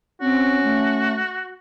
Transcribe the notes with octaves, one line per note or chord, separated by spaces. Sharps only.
C4 C#4 F#4
A3